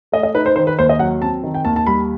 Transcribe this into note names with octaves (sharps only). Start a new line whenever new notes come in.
A3 D#5
D#5
D#4 B4
C5
D#3 C5
B4
D#2 C5
D#5
F#3 F#5
C4 A5
D#3
G5
D#2 A5
A5
G3 B5